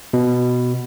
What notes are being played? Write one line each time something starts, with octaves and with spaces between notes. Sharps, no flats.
B2